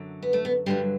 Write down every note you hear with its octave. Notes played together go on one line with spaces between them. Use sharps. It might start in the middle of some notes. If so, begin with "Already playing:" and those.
Already playing: F#2 D3 F#3
B3
A3
B3
G2 D3 F#3 G3